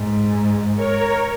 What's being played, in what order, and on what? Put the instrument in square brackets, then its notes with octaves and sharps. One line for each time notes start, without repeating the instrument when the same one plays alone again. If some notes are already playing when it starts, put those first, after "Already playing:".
Already playing: [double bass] G#2
[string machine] A#4 C#5